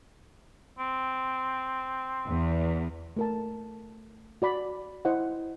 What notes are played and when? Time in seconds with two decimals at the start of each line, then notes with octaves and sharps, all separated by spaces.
0.79 C4
2.25 E2
3.16 A3 A#4 A5
4.42 F#4 D5 B5
5.05 E4 C5 D#5 F#5